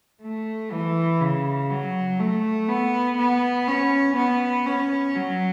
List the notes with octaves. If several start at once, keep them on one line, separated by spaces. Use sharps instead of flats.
A3
E3
C#3
F#3
A3
B3
B3
C#4
B3
C#4
F#3